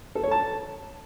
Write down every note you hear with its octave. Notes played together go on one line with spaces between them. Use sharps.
A4
C#5
A5